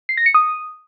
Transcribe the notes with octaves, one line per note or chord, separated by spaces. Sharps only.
C7
A#6
C#7
D#6